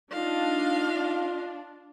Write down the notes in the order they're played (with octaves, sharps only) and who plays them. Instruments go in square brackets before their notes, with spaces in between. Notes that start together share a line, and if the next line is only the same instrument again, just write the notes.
[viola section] D4 [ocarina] D#4 [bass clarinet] F4 [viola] D#5 F5